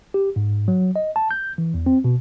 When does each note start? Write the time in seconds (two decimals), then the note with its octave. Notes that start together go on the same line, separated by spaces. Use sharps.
0.14 G4
0.36 G#2
0.68 F#3
0.96 D#5
1.16 A5
1.31 G6
1.58 E3
1.74 E2
1.86 C4
2.04 B2